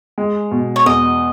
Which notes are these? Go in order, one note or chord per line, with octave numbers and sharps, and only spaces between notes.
G#3
B2
C#5
E2 D#5